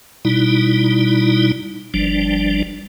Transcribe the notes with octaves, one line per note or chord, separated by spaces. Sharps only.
B2 G3 D#4 E4
G1 F3 G3 D4